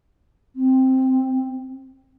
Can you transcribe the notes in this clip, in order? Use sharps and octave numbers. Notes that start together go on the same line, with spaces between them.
C4